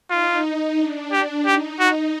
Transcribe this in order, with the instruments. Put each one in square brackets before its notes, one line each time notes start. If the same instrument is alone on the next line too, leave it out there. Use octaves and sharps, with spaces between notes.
[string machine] D#4 [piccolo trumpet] F4
[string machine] D4
[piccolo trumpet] G4
[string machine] D#4 [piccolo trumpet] G4
[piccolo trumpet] F#4